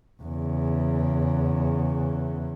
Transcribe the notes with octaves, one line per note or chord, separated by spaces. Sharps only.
E2 C#3